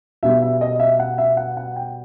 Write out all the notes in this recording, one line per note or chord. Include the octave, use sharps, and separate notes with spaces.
B2 G3 B3 E5
E5
D#5
E5
F#5
E5
F#5
F#5
G5